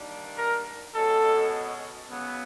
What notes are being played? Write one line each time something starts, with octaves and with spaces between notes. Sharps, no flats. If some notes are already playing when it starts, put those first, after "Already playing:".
Already playing: D#3 G3 A#3 D4
A#4
B2 G#3 C#4 A4
C#3 F#3 B3